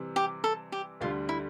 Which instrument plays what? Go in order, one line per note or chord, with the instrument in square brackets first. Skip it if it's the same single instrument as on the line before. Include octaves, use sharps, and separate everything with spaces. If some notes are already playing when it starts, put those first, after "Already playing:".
Already playing: [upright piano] C3 E3 G3 C4
[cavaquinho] G4
A4
G4
[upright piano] D2 D3 G3 [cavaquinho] F4
[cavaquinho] E4